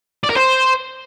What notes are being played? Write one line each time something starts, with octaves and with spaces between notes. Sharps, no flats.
D5
A#4
C5